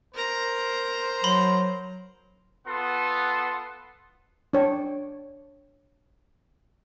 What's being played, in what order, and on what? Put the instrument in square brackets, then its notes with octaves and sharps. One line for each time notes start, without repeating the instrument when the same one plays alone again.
[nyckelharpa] A#4 A#5 [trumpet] C5
[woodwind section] F#3 [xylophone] B5 C6
[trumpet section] B3 F4 A4 F#5 C6
[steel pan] D4 C#5 G5